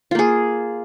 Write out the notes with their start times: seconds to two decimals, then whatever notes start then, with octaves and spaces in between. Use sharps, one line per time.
0.11 F4
0.15 A#3
0.19 G#4